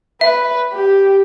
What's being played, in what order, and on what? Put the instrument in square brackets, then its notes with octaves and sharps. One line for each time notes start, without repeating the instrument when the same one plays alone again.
[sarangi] B4 [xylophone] E5
[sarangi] G4